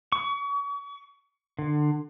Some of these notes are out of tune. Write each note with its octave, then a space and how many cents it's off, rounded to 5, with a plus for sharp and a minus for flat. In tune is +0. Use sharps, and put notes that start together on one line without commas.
C#6 +35
D3 +25